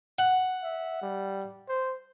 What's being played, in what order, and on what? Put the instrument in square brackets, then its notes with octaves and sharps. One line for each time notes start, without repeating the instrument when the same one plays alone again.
[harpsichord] F#5
[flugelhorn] E5
G3
C5